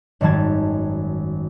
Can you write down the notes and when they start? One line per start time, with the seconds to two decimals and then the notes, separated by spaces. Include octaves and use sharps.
0.21 G#1 F#2 D#3 G3 A5 G#6